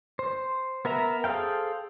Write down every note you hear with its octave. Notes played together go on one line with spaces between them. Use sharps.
C5
B3 A#4 E5 A#5
G#4 A4 C5 F5 G5